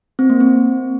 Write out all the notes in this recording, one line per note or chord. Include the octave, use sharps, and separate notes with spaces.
C4
A#3
C4